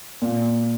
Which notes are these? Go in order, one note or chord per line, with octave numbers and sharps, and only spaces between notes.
A#2